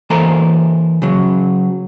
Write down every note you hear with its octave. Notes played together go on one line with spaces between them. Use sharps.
E3 A#3 A4 A#4 C5 A#5
C#3 F#3